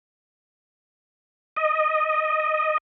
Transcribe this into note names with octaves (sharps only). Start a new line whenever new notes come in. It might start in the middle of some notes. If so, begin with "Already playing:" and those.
D#5